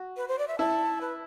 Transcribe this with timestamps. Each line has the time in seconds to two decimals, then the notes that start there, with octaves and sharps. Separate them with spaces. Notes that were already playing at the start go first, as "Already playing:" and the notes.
Already playing: F#4
0.17 B4
0.28 C5
0.38 D5
0.48 E5
0.58 E4 A5
1.01 B4